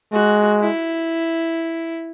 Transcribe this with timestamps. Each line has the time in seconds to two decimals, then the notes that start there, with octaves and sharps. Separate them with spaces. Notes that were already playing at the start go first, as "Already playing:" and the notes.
0.13 G#3 F#4
0.60 E4